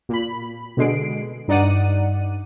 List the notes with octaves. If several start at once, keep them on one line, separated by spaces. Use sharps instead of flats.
A#2 B5
B2 D3 G#3 C7 D7
G2 D#4 D5 F#5 D#7